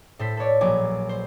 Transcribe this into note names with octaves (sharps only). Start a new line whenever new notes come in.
A2 A4 C5 B6
A4 B4 C#5 D5
A#1 F#3 G#5 D6
C5